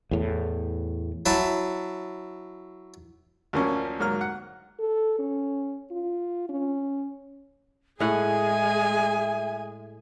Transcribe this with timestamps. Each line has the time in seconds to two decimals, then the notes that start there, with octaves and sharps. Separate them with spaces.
0.11 E2 A2
1.26 F#3 E4 A5
3.53 D2 F3 A#3 C#4
4.00 G#2 F#3 A#3 F6
4.21 F#5
4.79 A4
5.19 C#4
5.91 F4
6.49 C#4
8.00 A2 G#3 G#4 E5 F#5 G#5